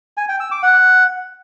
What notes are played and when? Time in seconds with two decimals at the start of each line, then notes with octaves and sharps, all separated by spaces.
0.17 G#5
0.29 G5
0.40 E6
0.51 D6
0.63 F#5